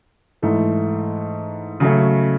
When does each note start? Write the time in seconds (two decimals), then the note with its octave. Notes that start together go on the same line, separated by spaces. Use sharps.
0.42 G#2 E3 A3
1.80 C#3 F#3 A3 C#4